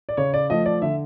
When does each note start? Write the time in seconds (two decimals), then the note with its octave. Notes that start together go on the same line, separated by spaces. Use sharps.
0.09 D5
0.17 C#3 C#5
0.34 D5
0.50 F3 A3 D#5
0.66 D5
0.82 D3 E5